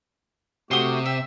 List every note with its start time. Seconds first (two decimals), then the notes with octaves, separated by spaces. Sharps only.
0.71 C3 A3 F#4 G4 C6 D#6
1.06 E5 G5